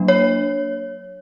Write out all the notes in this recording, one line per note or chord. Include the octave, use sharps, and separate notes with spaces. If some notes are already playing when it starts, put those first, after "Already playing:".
Already playing: F#3 A#3 D4
C#5